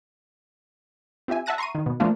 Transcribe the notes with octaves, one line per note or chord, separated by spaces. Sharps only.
C4 F4 G4 E5 G#5
E5 F#5 A5 F#6 A#6 D#7
A#5 C6 C#6 C7 D#7
D#3
B2
F3 A3 A#3 D4 F4